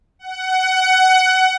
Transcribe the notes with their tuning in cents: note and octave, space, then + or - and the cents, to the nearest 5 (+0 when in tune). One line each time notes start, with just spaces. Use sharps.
F#5 +20